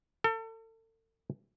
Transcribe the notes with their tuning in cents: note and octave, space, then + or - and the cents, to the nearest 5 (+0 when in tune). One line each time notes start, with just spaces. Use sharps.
A4 +35